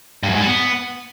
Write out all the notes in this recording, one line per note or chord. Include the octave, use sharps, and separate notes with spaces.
G2
F#2
G#2
G3
B3